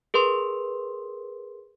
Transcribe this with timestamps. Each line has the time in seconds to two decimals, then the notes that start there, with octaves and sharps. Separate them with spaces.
0.14 G#4 A#4 B4 C6